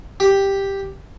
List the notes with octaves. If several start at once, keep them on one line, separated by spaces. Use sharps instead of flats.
G4